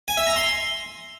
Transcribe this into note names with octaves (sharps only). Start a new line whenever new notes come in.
G#5
E5
A#5
C6